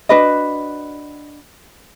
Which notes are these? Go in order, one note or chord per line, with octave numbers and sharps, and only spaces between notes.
D4 F#4 B4 D#5